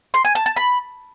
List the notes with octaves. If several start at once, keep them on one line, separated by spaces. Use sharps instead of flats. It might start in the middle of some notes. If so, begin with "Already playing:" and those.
C6
G#5
A5
A5
B5